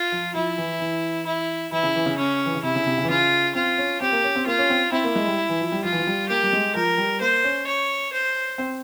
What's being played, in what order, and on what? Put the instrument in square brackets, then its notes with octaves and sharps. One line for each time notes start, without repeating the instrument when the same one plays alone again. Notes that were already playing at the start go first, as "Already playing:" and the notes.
Already playing: [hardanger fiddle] F4
[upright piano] F3
[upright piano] F3 [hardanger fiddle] E4
[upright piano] E3
E3
[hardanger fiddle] E4
[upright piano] E3 [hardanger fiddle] E4
[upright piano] C#3
E3
C#3
[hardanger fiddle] C#4
[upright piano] E3
C#3
[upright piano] C3 [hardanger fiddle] E4
[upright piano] C#3
C3
C#3
E3
[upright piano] C#3 [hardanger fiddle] F4
[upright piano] C4 [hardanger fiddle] F4
[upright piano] C#4
[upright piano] C4 [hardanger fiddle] G4
[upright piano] A#3
C#4
C4
[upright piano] A#3 [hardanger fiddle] F4
[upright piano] C#4
C4
[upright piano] C4 [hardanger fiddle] E4
[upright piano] A#3
G#3
G3
E3
F3
G3
[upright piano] F3 [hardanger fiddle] F4
[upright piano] E3
F3
G3
[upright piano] A#3 [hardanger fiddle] G4
[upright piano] G3
G#3
[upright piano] F3 [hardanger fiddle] A#4
[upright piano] G3
[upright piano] A#3 [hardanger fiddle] C5
[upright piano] C#4
[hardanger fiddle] C#5
C5
[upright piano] C4